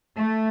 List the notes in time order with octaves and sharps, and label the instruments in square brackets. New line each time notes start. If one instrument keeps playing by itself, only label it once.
[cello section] A3